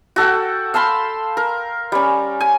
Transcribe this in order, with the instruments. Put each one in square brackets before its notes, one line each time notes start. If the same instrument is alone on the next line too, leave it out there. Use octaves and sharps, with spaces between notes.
[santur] F#4 A4 F#5 G5
F5 A5 B5 C6
A#4
G3 C#4
G#5